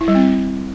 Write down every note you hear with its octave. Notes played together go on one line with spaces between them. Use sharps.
E4
G3
C4